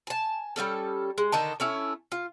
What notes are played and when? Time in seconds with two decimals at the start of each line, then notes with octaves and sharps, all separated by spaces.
0.07 G#5 A5
0.56 G3 B3 C#4 A4
1.18 G#3
1.32 D3 D#3 D#5 A5
1.60 A3 C#4 E4
2.12 F4